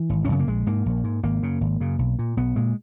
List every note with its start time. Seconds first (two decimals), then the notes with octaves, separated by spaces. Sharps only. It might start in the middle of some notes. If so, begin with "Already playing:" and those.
Already playing: E3
0.10 G#1
0.25 C#4
0.28 F#2 C#3 B3
0.39 A#3
0.47 A#1 G#3
0.67 G#2 A#3
0.86 A#1
1.04 G#2
1.23 G#1 A#3
1.43 F#2 C#3
1.61 G#1
1.80 F#2 C#3
1.99 B1
2.19 A#2
2.37 B1 B3
2.56 A#2 G#3